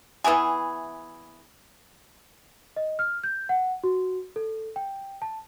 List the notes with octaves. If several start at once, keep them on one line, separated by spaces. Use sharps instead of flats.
E3 B3 E4 G#4
D#5
F6
G6
F#5
F#4
A4
G5
A5